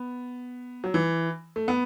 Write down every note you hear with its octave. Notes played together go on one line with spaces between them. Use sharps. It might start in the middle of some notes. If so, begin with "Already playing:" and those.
Already playing: B3
F#3
E3
A3
B3